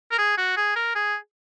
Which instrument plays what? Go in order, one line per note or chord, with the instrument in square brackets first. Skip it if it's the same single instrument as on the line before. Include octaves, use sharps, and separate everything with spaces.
[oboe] A#4
G#4
F#4
G#4
A#4
G#4